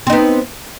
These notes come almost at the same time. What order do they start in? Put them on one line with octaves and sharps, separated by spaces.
C4 D#4 B3